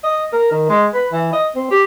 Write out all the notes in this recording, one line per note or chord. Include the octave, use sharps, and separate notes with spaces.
D#5
A#4
D#3
G#3
B4
E3
D#5
C4
G4